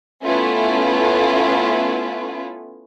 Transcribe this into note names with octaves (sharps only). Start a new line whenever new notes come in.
A3 B3 C#4 E4 F4 B4